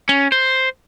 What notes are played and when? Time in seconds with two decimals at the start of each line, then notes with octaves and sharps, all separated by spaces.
0.09 C#4
0.32 C5